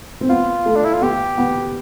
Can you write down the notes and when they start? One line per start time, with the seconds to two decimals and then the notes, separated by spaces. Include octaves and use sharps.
0.21 C4
0.29 B3 F4
0.66 A3
0.76 D4
0.84 E4
0.93 F4
1.01 B3 G4
1.38 B3